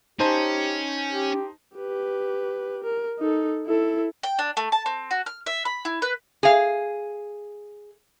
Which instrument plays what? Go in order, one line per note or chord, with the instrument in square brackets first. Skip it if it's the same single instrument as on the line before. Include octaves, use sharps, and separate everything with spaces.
[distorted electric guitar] C#4 [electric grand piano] D#4 C5 A5 [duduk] G4
[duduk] G4
[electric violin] G4 B4
A#4
D#4 A4
E4 A4
[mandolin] G5
D4
A3
A5
C4
F#4
F6
E5
B5
E4
B4
[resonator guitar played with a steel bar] G#4 F5